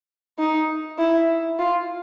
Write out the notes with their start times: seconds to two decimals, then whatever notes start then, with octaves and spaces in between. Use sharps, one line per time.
0.39 D#4
0.99 E4
1.59 F4